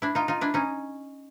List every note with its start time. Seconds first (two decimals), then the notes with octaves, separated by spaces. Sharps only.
0.02 D4 E4
0.15 D#4 F4
0.28 D#4 F4
0.41 D4 E4
0.54 C#4 D#4